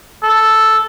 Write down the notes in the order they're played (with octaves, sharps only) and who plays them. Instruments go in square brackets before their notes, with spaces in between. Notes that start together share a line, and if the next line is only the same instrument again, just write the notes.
[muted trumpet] A4